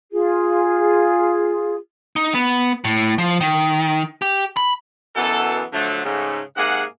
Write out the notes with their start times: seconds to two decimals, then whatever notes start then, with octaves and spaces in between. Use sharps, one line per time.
0.13 F4 G#4
2.16 D#4
2.35 B3
2.85 A2
3.18 F3
3.41 D#3
4.22 G4
4.57 B5
5.16 F#2 B2 E3 B3 A4
5.73 D3 F3 F#3 A3
6.05 G#2 C#3 A3
6.57 G#2 C3 A#3 G#4 F#5